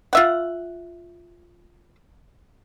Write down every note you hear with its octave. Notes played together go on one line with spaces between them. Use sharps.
F4 E5 F#5